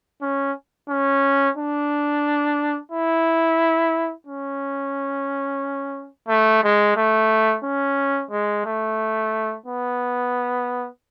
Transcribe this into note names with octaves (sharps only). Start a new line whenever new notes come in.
C#4
C#4
D4
E4
C#4
A3
G#3
A3
C#4
G#3
A3
B3